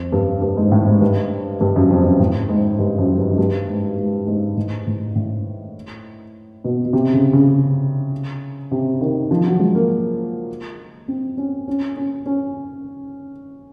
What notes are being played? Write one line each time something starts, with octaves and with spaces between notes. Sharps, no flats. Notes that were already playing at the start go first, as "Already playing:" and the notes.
Already playing: F2
G2
G2
G#2
A2
G#2
G2
G2
F#2
F2
F#2
A2
G#2
G2
F#2
G2
F#2
G2
G#2
G#2
G#2
A2
A2
A2
B2
B2
C3
C#3
C#3
C3
D#3
F3
F#3
G#3
A#3
C4
C#4
C#4
C#4
C#4